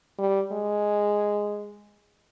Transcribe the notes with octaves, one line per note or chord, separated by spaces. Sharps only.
G3
G#3